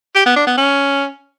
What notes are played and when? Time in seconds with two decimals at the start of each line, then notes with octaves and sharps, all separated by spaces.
0.15 G4
0.26 B3
0.36 D4
0.47 B3
0.57 C#4